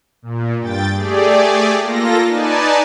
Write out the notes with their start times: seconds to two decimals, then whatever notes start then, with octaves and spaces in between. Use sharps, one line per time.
0.22 A#2
0.59 G2 G5 A6
0.95 A3 G4 G#4 D5
1.79 A#3 F4 A4 A#6
2.27 D#4 B4 D5 G#5 A5